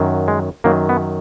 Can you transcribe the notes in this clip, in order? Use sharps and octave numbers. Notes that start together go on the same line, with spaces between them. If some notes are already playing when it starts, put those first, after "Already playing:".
Already playing: F#2 D#3 F#3
G#3
F#2 D#3 F#3 A#3
B3